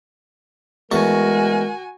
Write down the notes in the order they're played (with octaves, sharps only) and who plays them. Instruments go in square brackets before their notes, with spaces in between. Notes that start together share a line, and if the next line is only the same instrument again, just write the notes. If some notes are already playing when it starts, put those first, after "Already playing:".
[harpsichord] E2 A3 C#6 [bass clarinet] G#3 [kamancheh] F#4 G#5 [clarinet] A#4